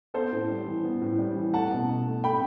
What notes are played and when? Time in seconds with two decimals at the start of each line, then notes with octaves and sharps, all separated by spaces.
0.14 B3 A4 C5
0.32 A2
0.49 G3
0.67 E3
0.84 B3
1.02 A2
1.19 G3
1.36 E3
1.54 A3 F#5 A5
1.71 B2
1.89 B2
2.07 A3
2.24 A3 G5 B5